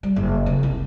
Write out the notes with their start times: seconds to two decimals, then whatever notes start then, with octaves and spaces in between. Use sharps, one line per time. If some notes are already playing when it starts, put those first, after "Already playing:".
0.03 G3
0.16 F#1
0.46 C#3
0.63 C2